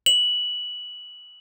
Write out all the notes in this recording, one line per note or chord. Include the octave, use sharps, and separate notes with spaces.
F#7